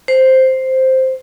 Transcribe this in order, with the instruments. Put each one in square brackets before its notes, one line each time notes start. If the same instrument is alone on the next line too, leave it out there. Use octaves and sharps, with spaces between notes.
[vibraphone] C5